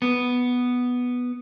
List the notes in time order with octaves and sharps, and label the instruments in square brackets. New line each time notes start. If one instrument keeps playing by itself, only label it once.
[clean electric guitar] B3